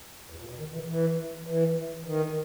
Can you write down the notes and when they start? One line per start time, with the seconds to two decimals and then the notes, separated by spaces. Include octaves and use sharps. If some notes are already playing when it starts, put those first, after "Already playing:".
0.30 E2
0.40 A#2
0.49 B2
0.59 D#3
0.74 E3
0.88 E3
1.46 E3
2.04 D#3